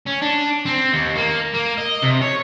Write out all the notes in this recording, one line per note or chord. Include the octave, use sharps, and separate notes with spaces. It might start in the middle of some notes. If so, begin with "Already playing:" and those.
C#4
D4
C4
D#2
A#3
A#3
D#5
C3
C#5